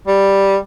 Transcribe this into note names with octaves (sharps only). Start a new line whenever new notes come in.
G3